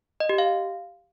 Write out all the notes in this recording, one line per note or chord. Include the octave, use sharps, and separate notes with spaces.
D#5
G4
F5